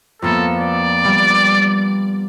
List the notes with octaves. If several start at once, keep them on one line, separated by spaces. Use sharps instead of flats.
F2 A#3 B3 A4
D5
G3 B3